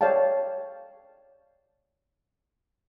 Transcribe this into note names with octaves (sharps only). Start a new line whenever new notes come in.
A4 C#5 D5 F5 G5 A5